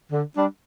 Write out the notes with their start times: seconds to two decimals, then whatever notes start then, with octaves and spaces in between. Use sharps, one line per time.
0.12 D3
0.36 G3 D4